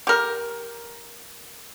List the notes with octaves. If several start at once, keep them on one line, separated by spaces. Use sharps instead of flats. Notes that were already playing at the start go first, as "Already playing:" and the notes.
G4 A#4